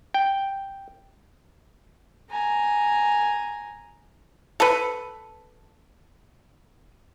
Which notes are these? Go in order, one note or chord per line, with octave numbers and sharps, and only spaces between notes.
G5
G#5 A#5
A4 B4